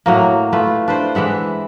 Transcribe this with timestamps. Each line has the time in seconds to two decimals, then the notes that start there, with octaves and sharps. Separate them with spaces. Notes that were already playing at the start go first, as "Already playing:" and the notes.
0.06 A2 F#3 A#3
0.53 A3 F4 B4
0.88 D4 B4 C5
1.15 E3 G#3 E5 F#5